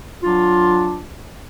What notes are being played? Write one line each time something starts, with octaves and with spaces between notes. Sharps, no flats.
F#3 D4 F4